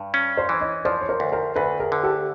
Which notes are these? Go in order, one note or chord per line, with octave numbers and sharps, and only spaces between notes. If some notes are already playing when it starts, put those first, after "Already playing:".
Already playing: G2
C#4
C5 D5
E3
C#5 D#5
F3 C5 D5
C#5
A#4 C5
D2
A#4 C5
D2 A4 B4
G#4 A#4
D3
G4 A4